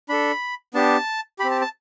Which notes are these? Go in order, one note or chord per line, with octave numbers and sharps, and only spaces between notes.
D4 A4 B5
B3 D4 G4 A5
C4 G4 B5
A5
A5